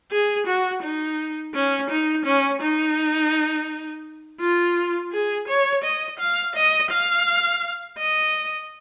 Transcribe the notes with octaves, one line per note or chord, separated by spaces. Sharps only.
G#4
F#4
D#4
C#4
D#4
C#4
D#4
F4
G#4
C#5
D#5
F5
D#5
F5
D#5